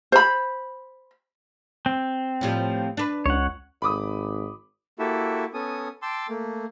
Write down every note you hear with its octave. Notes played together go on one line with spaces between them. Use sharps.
C5 B5
C4
A2 F3 G3
D4 B4
C#2 C#5 F#5
G#1 B5 D6 D#6
A#3 E4 F#4 G4 A4 E5
B3 C#4 A4 G#5 D#6
G5 A5 C6 D6 E6
A3 A#3